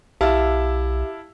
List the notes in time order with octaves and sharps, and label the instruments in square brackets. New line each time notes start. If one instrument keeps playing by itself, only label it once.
[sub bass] B1 [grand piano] E4 F5 A5 [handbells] G4 E5